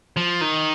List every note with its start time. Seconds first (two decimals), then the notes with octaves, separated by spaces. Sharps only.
0.17 F3
0.41 D#3